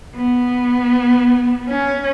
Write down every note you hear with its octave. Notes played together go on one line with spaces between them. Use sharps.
B3
C#4